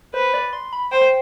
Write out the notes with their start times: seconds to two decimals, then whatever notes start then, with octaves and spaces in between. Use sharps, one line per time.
0.14 B4 C5
0.34 D5
0.53 C6
0.73 B5
0.92 C5 G5